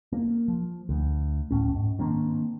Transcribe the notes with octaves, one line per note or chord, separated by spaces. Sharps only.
A#3
F3
D2
D1 A#1 A2 C#4
G#2
D#3 A#3 C4 D4